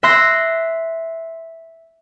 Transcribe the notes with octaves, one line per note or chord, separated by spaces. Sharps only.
E5 C6 F#6 A#6